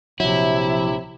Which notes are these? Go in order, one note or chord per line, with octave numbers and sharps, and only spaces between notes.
A#1 C3 F3 F#3 E4